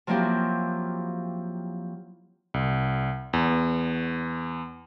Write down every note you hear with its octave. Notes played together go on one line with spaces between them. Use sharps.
F3 F#3 A#3 C4 E4 G4
C2
E2